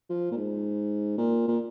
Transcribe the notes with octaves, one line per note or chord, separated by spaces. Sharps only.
F3
A#2
G#2
A#2
A#2